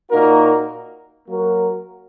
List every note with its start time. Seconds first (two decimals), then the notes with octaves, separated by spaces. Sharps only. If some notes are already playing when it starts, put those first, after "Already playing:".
0.10 A#2 A#3 D#4 F#4 A#4
1.27 F#3 A#3 F#4 A#4